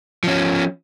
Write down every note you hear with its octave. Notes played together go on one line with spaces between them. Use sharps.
F3 C#4